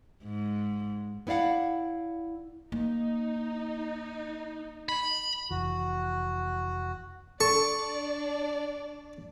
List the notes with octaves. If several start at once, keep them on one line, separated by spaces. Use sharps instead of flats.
G#2
B3 E4 D5 F5 F#5
A#3 D#4
B5
F1 E3 F#4
D4 A4 D5 C#6